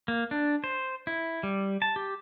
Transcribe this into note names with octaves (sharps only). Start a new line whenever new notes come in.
A#3
D4
C5
E4
G3
A5
G4